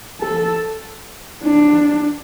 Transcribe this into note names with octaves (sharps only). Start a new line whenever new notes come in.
A4
D4